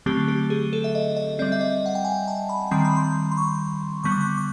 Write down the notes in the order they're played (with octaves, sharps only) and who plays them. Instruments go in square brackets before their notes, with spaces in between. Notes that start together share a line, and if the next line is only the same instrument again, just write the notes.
[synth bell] D3 F#3 A3 C4 G4
G4
G#4
A4
E5
D#5
D#5
G3 C4 D5
E5
D#5
F#5
G5
G#5
A5
B5
D#3 G3 C4 C6
B5
C6
C6
C#6
D3 G3 B3 C#6
D6
C#6
D6